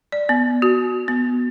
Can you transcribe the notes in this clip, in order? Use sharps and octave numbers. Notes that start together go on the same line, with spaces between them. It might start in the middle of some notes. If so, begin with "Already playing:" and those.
D5
B3
F#4
B3